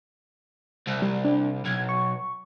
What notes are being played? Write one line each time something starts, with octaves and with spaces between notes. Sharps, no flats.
C2
G3
D4
B1 G#6
C#6